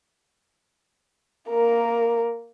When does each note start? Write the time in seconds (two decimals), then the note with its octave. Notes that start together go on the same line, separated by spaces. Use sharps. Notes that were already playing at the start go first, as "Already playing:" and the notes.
1.49 A#3 A#4